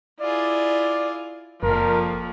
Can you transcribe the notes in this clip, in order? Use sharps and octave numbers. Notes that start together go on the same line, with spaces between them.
E4 F4 G#4 D5
F#1 F2 A#2 F3 A#4